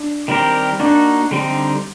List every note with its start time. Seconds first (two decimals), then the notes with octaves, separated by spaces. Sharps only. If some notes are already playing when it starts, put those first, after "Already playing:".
Already playing: D4
0.28 D#3 G3 C4 G4 A#4
0.79 A#3 D4 D#4 F#4
1.31 D3 G3 C4 D#4